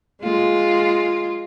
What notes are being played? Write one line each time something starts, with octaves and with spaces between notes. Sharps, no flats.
G#3 F4